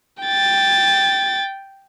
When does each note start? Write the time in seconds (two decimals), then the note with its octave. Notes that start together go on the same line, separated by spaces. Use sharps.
0.23 G5 A6